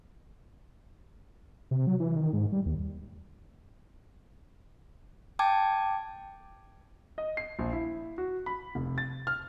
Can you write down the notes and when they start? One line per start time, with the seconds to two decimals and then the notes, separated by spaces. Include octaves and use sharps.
1.71 C3
1.87 F#3
2.00 E3
2.16 D#3
2.33 G#2
2.52 G3
2.66 D#2
5.39 G5 A5 D6 G#6
7.18 D#5
7.37 C7
7.59 A#1
7.73 E4
8.18 F#4
8.46 B5
8.75 F1
8.98 A6
9.27 F6